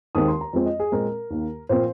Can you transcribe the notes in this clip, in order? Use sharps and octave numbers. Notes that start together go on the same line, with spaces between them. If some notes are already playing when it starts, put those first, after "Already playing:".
D#2 D#3 G#3 C4 D#6
C6
A#5
F2 F3 G#3 C4
D#5
G#4
A#2 G#3 C4 A#4
D#2 D#3 A#3
A#2 F3 C4 C5